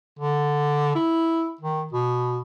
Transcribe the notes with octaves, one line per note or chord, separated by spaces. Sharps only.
D3
E4
D#3
B2